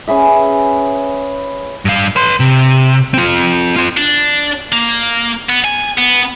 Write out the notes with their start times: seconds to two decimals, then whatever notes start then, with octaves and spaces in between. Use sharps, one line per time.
0.07 C#4 G#4 B4 E5
1.85 G2 F5
2.16 B4 C6
2.40 C3
3.14 C4 F4
3.76 C4 F4
3.97 D4
4.72 A#3
5.50 B3
5.65 G#5
5.98 B3